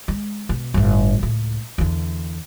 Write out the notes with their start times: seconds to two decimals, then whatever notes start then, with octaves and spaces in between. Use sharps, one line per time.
0.08 G#3
0.49 B2
0.74 G1 A2
1.19 C#2 A2
1.78 E2 D3